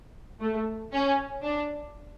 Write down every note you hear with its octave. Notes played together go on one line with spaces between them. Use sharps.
A3
C#4
D4